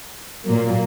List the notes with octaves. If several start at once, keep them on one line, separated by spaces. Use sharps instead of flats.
A#2 F#3 A#3